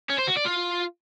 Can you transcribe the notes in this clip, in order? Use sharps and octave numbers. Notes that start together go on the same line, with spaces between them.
C#4
C5
F#4
D5
F4